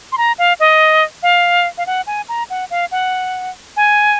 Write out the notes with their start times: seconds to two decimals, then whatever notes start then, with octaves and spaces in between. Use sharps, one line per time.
0.12 C6
0.18 A#5
0.38 F5
0.60 D#5
1.23 F5
1.78 F5
1.87 F#5
2.07 G#5
2.29 A#5
2.50 F#5
2.71 F5
2.91 F#5
3.77 G#5